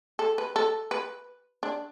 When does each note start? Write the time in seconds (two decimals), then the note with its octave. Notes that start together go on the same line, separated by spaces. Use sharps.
0.19 A4
0.38 B4
0.56 A4
0.91 B4
1.63 D4